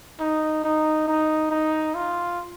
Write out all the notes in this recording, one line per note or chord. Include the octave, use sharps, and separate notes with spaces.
D#4
D#4
D#4
D#4
F4